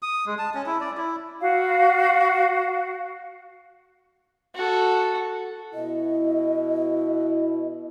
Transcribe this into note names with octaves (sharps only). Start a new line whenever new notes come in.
D#6
G#3
A5
C#4
E4
D5
E4
F#4 F5
F#4 A4
B2 E4 D#5